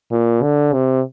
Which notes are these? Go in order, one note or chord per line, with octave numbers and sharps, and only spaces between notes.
A#2
D3
C3